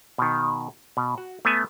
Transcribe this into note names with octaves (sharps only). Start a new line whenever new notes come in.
B2 D#3
B2
F#4
A3 B3 G#5